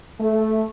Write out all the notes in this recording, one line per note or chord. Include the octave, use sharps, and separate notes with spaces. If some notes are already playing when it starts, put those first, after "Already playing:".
A3